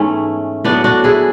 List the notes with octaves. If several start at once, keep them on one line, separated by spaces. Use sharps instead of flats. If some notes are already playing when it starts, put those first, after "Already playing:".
Already playing: G#2 E3 A3 B3 C#4
A2 F#3 B3 D4
D4 F#4
E4 G#4